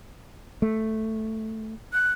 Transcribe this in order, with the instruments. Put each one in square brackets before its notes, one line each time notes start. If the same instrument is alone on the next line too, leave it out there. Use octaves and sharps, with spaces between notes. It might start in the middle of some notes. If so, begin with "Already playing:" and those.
[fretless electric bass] A3
[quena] F#6